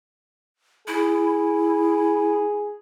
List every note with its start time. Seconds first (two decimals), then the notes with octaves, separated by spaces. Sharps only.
0.88 E4 G#4